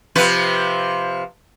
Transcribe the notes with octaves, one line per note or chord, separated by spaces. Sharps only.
C3 F3 B4